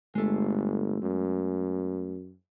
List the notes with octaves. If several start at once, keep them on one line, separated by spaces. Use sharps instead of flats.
G1 G#3 A3
F#2